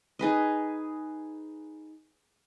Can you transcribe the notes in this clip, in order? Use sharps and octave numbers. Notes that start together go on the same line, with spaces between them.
D#4 G#4 B4 D#5